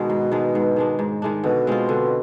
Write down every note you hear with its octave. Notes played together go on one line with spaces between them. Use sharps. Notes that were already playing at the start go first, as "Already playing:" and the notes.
Already playing: B2 D#3 G#3 D4
G#2
D#3 G#3 D4
G#2
D#3 G#3 D4
G#2
D#3 G#3 D4
B2 D3
G#3 C4 F4
D3